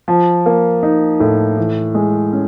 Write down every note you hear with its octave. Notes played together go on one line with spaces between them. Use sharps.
F3
A#3
D#4
A2
E3
G#3
C#4